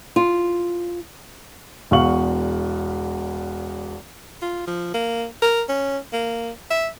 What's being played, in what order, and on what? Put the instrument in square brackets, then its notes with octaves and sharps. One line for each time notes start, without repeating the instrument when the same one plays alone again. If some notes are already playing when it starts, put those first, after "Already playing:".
[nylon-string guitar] F4
[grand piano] E1 E2 F5 C#6 F#7
[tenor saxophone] F4
F3
A#3
A#4
C#4
A#3
E5